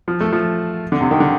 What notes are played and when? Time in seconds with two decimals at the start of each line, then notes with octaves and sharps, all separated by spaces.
0.08 F3
0.21 A3
0.33 F3
0.92 D3
1.01 C3
1.11 D#3
1.20 D3